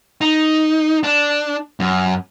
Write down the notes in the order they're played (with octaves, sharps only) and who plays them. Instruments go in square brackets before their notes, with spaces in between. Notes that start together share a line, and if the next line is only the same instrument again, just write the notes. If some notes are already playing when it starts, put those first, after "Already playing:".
[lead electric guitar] D#4
D4
F#2